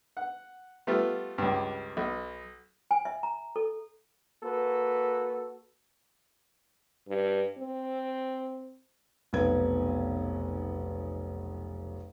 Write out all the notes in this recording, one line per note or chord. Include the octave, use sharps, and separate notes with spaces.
F#5
G3 A3 B3 F4
C#2 G2
B1
G#5
E5
A#5
A4
A#3 F#4 A4 B4
G2
C4
F1 B1 B3 G#6